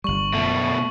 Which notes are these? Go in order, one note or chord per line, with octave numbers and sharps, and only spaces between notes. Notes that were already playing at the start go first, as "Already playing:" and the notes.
G1 G3 C#6 F#7
F#2 B2 A3